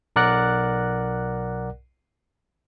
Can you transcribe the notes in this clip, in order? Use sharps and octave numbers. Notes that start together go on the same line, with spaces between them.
B1 A#4 D5 F#5 F#6 A#6